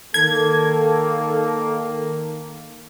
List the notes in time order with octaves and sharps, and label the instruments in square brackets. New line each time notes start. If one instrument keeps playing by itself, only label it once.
[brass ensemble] D#3 A#3 [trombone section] A4 [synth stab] G#6